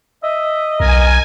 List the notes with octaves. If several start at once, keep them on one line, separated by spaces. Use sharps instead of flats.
D#5 E5
B1 A#4 G#5